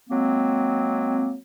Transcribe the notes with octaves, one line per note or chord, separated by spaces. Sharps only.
F#3 G#3 A#3 C4